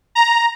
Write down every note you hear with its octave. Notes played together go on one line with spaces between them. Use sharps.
A#5